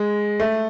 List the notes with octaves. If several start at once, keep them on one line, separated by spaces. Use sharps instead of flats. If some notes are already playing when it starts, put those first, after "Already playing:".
Already playing: G#3
A3